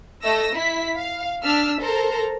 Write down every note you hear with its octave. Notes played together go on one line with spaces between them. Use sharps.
A3 D#5 E6 A#6
E4 B6
F5
D4 E6 F6 B6
A4 A#4 C5 A#5